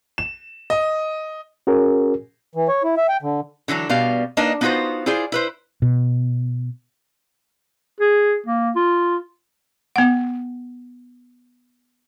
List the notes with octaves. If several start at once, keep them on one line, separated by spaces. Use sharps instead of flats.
E7
D#5
C#4 F#4 G#4 A#4
E3
C#5
E4
E5
G5
D3
D3 E3 F#3 D4
B2 G3 B3 D5 F5
A#3 D4 D#4 B4 D#5
B3 D#4 F4 F#4 B4 C5
E4 F4 G#4 C5 D5
E4 B4 C5
B2
G#4
A#3
F4
B3 F#5